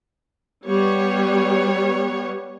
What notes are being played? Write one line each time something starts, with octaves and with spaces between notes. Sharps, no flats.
G3 B3 C#5